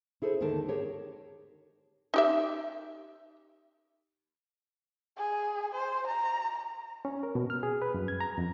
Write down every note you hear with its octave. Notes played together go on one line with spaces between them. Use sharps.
E4 G#4 A4 C5
D#2 D3 D#3 A4 A#4 A5
G4 G#4 A#4 C#5
D#4 G4 E5
G#4
C5
A#5
C#4
A#4
B2
F6
G#4
B4
F#2
G#6
A#5
F2